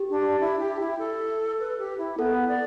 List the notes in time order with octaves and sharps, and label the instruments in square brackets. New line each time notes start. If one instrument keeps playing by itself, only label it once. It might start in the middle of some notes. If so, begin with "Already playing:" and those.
Already playing: [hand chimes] G4
[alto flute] D4
E4
G4
E4
A4
B4
G4
E4
[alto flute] B3 [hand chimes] A4
[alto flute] D5